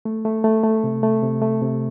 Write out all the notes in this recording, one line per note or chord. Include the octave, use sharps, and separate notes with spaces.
A3
A3
A3
A3
C3
A3
C3
A3
C3